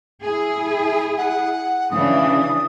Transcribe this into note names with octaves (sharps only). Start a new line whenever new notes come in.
E4 G#4
F#5
C#3 E3 D4 D#6